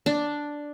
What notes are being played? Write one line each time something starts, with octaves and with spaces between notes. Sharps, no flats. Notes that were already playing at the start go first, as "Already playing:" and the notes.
D4